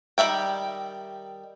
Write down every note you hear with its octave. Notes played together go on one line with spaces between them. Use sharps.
D#3 F3 G3 E5 G5